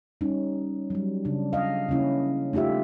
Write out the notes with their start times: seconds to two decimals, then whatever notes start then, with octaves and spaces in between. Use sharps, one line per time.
0.21 G3 C#4 D#4
0.90 F#3 G3
1.25 C#3 D4
1.53 D#5 F5
1.89 C#3 A#3 C#4 E4
2.53 A3 D#4 F4 G4 E5